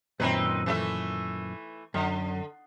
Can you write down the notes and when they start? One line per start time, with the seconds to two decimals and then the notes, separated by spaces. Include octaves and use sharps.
0.20 F#2 A#2 D#3 C4 D#4 B4
0.66 E3 A3 E5
1.94 F#2 D3